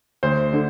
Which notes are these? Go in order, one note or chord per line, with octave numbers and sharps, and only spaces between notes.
D2 C5
D3